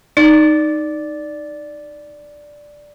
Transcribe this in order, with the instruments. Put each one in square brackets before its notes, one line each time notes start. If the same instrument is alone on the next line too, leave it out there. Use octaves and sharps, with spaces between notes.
[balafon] D#4 [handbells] D5